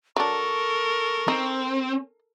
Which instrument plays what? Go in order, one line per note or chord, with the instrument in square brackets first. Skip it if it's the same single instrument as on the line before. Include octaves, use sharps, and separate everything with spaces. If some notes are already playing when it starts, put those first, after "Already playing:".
[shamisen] F#3 D4 [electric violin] A4 A#4 [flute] C#6
[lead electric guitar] C4 [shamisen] D#4